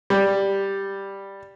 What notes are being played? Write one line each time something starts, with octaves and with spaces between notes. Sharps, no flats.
G3